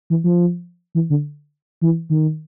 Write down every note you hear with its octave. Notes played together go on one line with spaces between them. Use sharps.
E3
F3
E3
D3
E3
D#3